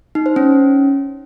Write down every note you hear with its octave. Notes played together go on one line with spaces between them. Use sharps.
D#4
C5
C#4